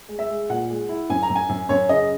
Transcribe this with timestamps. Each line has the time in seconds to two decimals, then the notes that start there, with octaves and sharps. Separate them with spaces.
0.09 G#3
0.19 E5
0.30 G#3
0.50 A#2 F#5
0.70 G#3
0.89 E4
1.10 F#2 G#5
1.23 A#5
1.29 F#2
1.36 G#5
1.49 F#2
1.69 F#2 C#5
1.89 C#3 D#5